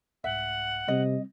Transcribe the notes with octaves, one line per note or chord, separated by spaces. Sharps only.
C2 G#2 E5 F#5
C3 G3 C4 D#5